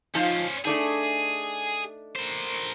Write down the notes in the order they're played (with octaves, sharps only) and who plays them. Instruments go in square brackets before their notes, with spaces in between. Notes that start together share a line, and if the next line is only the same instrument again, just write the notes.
[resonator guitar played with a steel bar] F3 D#4 F4 [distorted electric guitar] C#4 C5
[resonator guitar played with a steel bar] A3 D4 D#4 [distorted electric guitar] G#4
[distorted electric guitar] A#4 C5